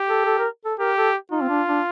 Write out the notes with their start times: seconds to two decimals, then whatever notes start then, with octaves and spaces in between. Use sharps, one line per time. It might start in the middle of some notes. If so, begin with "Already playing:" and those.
Already playing: G4
0.09 A4
0.25 A4
0.39 A#4
0.65 A4
0.79 G4 A#4
0.97 A4
1.32 D#4 F4
1.42 C4
1.49 D4
1.68 D4